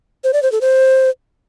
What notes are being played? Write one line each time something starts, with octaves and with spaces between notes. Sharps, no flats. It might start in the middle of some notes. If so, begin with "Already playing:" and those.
C5
D5
C5
A4
C5